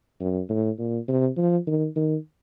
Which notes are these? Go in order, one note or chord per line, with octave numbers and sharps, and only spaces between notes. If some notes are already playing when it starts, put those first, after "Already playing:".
F#2
A2
A#2
C3
F3
D#3
D#3